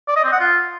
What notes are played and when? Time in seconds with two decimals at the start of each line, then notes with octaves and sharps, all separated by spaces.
0.08 D5
0.16 D#5
0.24 C4
0.32 F#5
0.40 F4